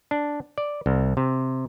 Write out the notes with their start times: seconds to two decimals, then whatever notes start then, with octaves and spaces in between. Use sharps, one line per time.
0.11 D4
0.58 D5
0.86 C2
1.17 C3